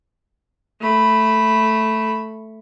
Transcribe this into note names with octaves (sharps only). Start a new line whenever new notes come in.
A3 B5